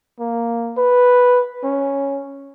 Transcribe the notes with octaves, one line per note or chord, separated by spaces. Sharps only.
A#3
B4
C#4